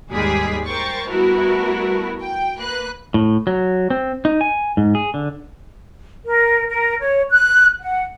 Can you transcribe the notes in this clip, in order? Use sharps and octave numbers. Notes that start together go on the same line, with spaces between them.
D#2 G#2 G3 G#3 G#4 B6
A#4 C5 G5 C#6 A6
G3 A3 B3 E4 F#4 A#4
G5
A#3 B4 F#6
A2
F#3
C4
D#4
G#5
G#2
G#4
D3
A#4
A#4
C#5
F#6
F#5